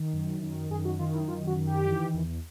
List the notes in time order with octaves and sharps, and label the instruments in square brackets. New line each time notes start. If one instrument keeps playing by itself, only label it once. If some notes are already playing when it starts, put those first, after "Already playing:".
Already playing: [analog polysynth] D#3
F#2
D#3
F#2 G#4
F#4
D#3 F4
E4
F#2 F4
F#4
D#3
G4
E3
E2